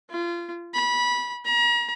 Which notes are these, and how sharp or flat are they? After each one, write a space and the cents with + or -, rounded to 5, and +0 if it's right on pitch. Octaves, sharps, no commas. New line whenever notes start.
F4 -25
B5 -20
A#5 +40